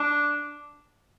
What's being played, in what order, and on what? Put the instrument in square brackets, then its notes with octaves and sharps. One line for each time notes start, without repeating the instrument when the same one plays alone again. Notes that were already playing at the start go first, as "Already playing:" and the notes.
Already playing: [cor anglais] D4